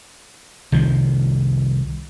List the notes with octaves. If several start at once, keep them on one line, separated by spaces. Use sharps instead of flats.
C2 D#3 F3